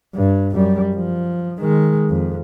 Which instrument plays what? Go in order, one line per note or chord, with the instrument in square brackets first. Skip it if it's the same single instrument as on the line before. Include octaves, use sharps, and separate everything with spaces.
[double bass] G2
F#2 G3
F3
D#3 G#3
F2